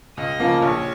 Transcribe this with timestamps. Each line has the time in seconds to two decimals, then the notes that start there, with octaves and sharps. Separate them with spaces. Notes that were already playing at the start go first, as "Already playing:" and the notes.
0.17 C#2 D#5
0.40 C#3 F3 A#3
0.62 A#1 C#5